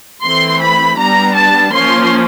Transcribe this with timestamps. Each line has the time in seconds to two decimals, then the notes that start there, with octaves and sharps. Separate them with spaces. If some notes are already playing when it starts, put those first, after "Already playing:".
0.24 E3 A3 C4 C6
0.61 B5
0.99 G3 B3 D4 A#5
1.35 A5
1.72 F3 A#3 C#4 C6